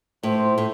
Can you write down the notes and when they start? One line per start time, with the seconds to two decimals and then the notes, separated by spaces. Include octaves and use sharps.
0.23 A2 C5
0.58 A2